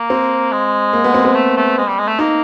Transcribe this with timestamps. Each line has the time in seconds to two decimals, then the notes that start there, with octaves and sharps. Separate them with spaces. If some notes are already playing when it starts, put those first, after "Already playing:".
Already playing: A#3
0.10 C4
0.52 G#3
0.93 A#3
1.04 B3
1.14 C4
1.25 C4
1.35 A3
1.57 A3
1.78 G#3
1.88 G3
1.98 G#3
2.08 A3
2.19 A#3 D#4